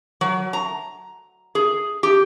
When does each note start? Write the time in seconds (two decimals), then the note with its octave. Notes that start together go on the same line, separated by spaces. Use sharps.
0.21 F#3
0.53 A#5
1.55 G#4
2.03 G4